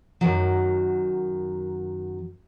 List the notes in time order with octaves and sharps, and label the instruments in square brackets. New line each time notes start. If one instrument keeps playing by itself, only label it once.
[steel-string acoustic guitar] F#2 D#3 F#3